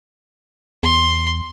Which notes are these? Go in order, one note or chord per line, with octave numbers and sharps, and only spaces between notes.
E2 C6